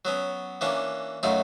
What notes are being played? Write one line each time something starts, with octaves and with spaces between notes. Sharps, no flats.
F#3 B3 C#4
E3 A#3 C#4 D4
F#2 F#3 A3 D#4 F4